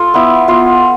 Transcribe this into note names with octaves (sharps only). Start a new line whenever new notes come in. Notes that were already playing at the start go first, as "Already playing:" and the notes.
Already playing: F4 A4
B3 E4
B3 F4